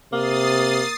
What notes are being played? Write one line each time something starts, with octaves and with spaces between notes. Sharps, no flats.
C3 A#3 D#6 A6 C7